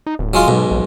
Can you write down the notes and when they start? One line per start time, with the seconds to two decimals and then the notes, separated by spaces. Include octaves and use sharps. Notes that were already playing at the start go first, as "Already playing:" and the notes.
0.07 D#4
0.19 D1
0.34 F#3 G#3 F4
0.48 B1 G#2 B2
0.71 A#1